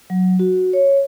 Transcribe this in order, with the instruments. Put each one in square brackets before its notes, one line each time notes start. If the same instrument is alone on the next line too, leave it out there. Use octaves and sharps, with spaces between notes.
[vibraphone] F#3
F#4
C#5